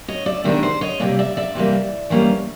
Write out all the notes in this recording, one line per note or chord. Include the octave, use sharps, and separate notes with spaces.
C#5 D#5
D5 E5
C3 D#3 G#3 B3 D4 D5 E5
C5 D5
C#5 D#5
C3 E3 G3 A#3 D5 E5
D5 E5
D5 E5
C3 E3 G3 A#3
E3 G3 A#3 C#4